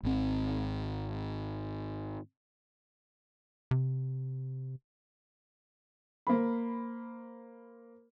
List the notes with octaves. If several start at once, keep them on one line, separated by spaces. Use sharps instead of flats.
G#1 C4
C3
A#3 C5 B5